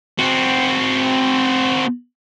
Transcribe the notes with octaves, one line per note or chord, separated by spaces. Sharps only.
C4 F#4